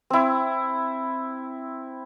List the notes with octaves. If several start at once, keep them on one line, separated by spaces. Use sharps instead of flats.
C4 E4